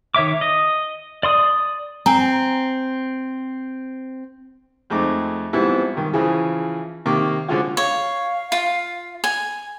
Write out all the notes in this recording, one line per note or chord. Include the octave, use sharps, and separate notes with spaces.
D#3 C#5 E5 D6
D#5
D5 C6 D#6
C4 G#5 A#5
F2 G#3 A3 C4 D#4 D6
G#2 F3 G3 B3 C4 E4
G2 D#3
C#3 E3 F3 G#4
C3 D#3 A#3 C#6 D6
D3 F3 G#3 C#4 F4 F#4
C#5 F5
F4
G#5